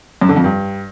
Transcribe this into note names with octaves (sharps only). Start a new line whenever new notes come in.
F#2
D3
F2
G2